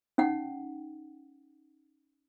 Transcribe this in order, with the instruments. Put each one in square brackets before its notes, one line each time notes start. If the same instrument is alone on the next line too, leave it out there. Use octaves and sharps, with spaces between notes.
[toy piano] C#4 D#4 F#5 G5